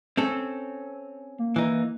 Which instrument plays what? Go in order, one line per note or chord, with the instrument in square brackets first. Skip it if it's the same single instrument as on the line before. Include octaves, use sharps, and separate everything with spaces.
[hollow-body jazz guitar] C4 C#4 A4
[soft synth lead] A#3
[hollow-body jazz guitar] E3 D#4